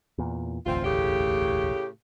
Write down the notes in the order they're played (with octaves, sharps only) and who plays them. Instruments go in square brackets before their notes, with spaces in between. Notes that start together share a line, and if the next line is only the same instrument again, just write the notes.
[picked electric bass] E2 A#2
[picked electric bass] E1 A1 D2 [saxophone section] C4 F4
[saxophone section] A2 C#3 G4